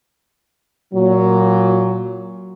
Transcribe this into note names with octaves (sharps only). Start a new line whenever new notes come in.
A#2 F#3